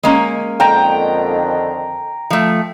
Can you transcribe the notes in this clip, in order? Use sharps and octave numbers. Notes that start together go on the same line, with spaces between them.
G#3 A#3 C#4
F2 D3 D#3 G5 A#5
F3 A3